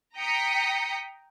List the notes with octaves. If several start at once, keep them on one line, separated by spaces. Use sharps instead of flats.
G5 A#5 D#6 B6 C#7